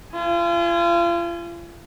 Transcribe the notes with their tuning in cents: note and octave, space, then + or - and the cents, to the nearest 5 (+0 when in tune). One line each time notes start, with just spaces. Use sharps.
F4 -35 G#5 +0